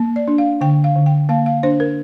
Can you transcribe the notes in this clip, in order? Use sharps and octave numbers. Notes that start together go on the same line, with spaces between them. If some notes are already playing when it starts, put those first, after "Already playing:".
Already playing: A#3
D5
D4
F5
D3 G5
F5
D3
G5
A#3 F5
F5
D4 C5
A#4